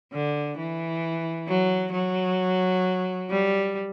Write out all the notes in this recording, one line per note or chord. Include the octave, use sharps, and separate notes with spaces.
D3
E3
F#3
F#3
G3